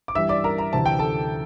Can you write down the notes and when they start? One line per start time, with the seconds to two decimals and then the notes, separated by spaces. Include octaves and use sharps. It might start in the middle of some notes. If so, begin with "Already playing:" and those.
0.08 D6
0.15 G2 E3 G3 E5 E6
0.29 D5 D6
0.44 A#4 A#5
0.58 A#5
0.73 D2 C3 E3 G3 C4 A5
0.86 G5
0.99 A4 A5